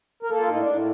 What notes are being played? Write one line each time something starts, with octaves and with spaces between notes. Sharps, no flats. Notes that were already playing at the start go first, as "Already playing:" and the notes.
A#4
A#3 A4
F4
A2 D#4
D4
A2